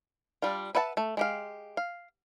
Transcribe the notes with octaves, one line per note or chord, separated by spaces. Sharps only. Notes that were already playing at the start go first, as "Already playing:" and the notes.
G3 D4 F4
B4 E5 F#5 A5
A3
G#3 G4 F5
F5